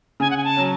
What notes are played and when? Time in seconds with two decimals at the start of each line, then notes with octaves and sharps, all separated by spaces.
0.20 C#3 G#5
0.30 F#5
0.37 G#5
0.44 A5
0.57 F#3 C#4